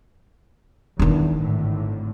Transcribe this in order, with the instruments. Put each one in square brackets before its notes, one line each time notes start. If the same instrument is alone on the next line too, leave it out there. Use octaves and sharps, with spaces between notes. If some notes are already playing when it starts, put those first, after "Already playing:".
[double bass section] E2 [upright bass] D#3 D4
[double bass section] G#1 A2 D3